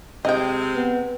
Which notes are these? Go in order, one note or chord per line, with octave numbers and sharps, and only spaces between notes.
C3 G#3 C4 D#5 G5
B3